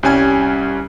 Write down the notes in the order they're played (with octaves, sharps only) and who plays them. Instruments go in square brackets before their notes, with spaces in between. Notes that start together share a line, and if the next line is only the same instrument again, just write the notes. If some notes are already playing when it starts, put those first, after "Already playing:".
[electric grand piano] C2 G3 C#4 G#5 G#6